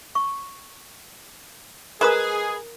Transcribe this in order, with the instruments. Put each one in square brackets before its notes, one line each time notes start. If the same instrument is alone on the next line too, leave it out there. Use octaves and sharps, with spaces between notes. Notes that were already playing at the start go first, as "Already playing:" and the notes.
[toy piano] C#6
[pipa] G#3 B4 [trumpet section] G#4 [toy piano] A#4 A#5 D#6